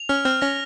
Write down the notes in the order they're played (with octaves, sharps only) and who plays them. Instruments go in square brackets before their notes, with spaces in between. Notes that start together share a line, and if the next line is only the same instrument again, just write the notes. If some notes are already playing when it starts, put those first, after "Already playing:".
Already playing: [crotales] F7
[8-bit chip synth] C#4 [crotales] F6
[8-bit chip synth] C4 [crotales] F6
[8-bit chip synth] C#4 [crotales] A#6